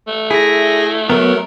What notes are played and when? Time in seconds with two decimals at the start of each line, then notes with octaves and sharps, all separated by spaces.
0.08 A3
0.30 E4 G#4 A#6
1.10 F#3 B3 A#4